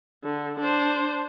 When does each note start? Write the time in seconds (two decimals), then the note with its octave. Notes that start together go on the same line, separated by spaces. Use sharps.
0.24 D3
0.60 D4 C5